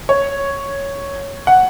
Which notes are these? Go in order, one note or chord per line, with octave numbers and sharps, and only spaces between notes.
C#5
F#5